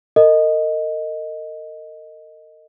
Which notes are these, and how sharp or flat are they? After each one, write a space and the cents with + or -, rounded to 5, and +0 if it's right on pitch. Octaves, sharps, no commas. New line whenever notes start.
A#4 -40 D#5 +0